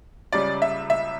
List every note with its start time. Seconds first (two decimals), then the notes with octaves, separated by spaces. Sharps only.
0.32 C#2 C#3 G3 D5
0.62 E5
0.90 E5